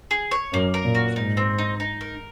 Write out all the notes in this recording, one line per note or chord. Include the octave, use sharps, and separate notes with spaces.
G#4
C#5
F#2 A#3
A#4
A#2
F#4
G#2 D#4
C4
D#4
D#4
A#4